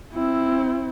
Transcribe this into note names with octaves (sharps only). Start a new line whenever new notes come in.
C4 E4